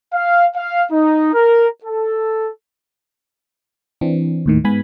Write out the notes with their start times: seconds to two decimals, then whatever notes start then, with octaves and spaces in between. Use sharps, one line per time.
0.13 F5
0.55 F5
0.92 D#4
1.34 A#4
1.84 A4
4.01 E3 C4 D4
4.46 D#2 A2 D#3
4.65 G#2 B3 G#5 B5